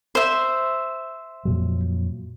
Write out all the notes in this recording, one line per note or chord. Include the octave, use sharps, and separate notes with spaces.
C5 E5
F2 A#2 F#3